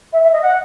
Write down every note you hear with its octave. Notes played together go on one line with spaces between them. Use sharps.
E5
E5
D#5
F#5